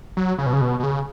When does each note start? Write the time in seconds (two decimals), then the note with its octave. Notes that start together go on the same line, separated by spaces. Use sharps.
0.17 F#3
0.38 C#3
0.46 B2
0.53 C#3
0.61 B2
0.80 B2
0.83 C#3